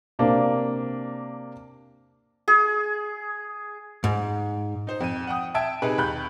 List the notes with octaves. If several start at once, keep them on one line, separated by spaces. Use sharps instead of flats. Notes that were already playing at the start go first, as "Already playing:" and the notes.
C3 A#3 D4
G#4
G#2
D#4 C5
F2 D#7
F#5 G5 D#6
E5 G5 A5 E6 G#6 D7
C3 D#4 G#4 B4
D#2 B5 F#6 G6